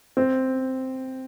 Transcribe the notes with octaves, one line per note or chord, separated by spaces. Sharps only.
C4